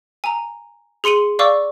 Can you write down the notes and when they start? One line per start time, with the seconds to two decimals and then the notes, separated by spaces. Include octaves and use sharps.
0.24 G#5 A#5
1.04 G#4 C6 C#7 D#7 F#7
1.39 D5 F5 C#6 D6 E6